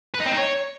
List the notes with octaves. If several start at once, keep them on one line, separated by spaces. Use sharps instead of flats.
B4
D#4
C4
D#4
C#5